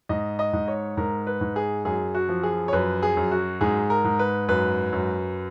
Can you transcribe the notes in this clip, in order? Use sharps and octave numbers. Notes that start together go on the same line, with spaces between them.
G#2 D#5
D#5
G#2
C#5
G#2 A#4
B4
G#2
G#4
F#2 G#4
F#4
F3
G#4
C#5
F#2 B4
G#4
F#2
F#4
G#2 G#4
A#4
G#2
B4
F#2 B4
F#2